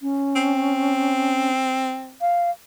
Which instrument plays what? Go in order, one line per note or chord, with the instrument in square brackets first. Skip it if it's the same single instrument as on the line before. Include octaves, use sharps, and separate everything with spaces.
[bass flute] C#4
[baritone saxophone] C4
[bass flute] F5